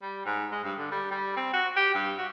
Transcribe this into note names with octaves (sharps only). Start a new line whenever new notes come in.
G3
G#2
G#3
G2
D3
G3
G3
C4
F#4
G4
G2
F#4